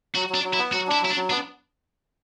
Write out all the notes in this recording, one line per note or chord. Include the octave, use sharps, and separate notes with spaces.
F#3 F#4
F#3
D4
F#3
E4
B3
F#3 F#4
D4 E4
F#3 E4
D4
F#3
B3 D4